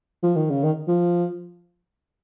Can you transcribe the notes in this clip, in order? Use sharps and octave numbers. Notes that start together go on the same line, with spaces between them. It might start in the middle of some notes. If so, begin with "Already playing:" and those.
F3
D#3
C#3
D#3
F3